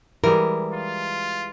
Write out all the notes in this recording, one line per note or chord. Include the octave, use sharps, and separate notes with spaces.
E3 G3 G#3 A#4
F4